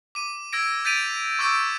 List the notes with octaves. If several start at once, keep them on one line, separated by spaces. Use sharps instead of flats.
D6 D#7
E6 G#6 A#6 D7
G6 A6 B6 D7 D#7 F7
C#6 D6 E6 G6 D7